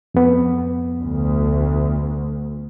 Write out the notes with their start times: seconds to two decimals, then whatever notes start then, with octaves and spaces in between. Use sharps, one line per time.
0.14 F2 B3
1.02 D2